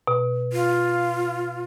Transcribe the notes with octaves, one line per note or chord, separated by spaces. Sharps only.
B2
F4